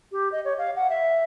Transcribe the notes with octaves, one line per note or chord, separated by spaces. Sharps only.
G4
D#5
C#5
F5
F#5
E5